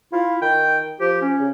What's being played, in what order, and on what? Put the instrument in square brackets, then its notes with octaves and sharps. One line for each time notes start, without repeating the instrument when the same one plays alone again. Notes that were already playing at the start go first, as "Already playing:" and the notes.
[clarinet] E4 [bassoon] F4
[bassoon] D#3 [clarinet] G5
[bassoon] F3 [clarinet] G4
[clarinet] C#4
[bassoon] C#3